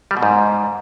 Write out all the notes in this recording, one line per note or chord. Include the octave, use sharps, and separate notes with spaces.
G3
B2
G#2